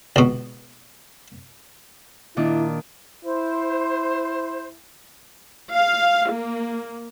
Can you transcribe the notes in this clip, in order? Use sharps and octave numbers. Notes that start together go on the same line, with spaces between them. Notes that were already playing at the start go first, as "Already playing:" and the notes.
C#2 B2
A#2 D#3 D4 E4
E4 C5
F5
A#3